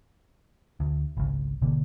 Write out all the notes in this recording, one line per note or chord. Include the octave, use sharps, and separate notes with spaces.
D2
G#1 C#2
G#1 B2 D3 A#3